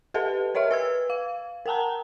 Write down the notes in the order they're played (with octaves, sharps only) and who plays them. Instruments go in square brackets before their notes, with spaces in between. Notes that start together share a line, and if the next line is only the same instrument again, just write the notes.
[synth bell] G4 A4 B4 D#5 A5
A#4 C#5 D#5 E5 F6
B4 E6 G#6
F5
A#4 F#5 G5 A5 A#5